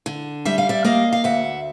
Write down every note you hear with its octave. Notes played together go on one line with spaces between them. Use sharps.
D3
G3 E5
F5
D5 E5
A#3 D#5 F5
F5
D2 E5 F#5